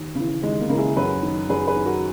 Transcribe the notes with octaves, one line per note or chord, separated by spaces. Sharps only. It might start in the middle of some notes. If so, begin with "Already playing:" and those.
Already playing: D#2
C#3 E3
D#2 G#3
A#3
C#3 A#4
E3 E4 G#4
F#2 G#4 B4
D#3
F#2 G#4 B4
G#4 B4
D#3
F#4 A#4